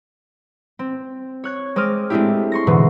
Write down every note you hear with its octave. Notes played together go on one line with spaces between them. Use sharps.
C4
C#5 F#6 G#6
G#3 C4 D6 D#6 F6 A#6
G#3 A3 C4 D4 E4 G4
C6 C#6 A#6
G#2 B2 D3 E3